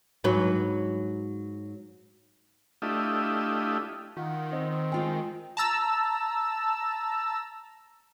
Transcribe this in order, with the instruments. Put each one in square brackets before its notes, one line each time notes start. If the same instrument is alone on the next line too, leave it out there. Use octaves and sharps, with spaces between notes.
[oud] G#2 F#3 B4
[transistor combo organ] A3 D4 E4 F4 G4 D#5
[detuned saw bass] D#3 [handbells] F4 F#5
[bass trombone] C4 [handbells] D#5
[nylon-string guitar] G#3 F4 G5
[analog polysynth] A5 A#5 E6